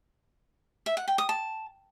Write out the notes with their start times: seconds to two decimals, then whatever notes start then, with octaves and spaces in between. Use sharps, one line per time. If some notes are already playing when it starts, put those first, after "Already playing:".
0.86 E5
0.97 F#5
1.08 G5
1.18 D#6
1.29 A5